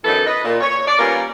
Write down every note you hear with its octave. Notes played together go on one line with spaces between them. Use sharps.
F#2 E3 B3 D#4 A4 B4
B4 D#5
A#2
C#5
D5
G3 A#3 B3 C#4 F4 A#4